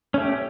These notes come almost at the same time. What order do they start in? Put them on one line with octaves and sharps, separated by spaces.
C#4 A3 G4